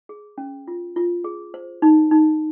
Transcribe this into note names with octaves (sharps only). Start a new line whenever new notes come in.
G#4
C#4
F4
F4
G#4
C5
D#4
D#4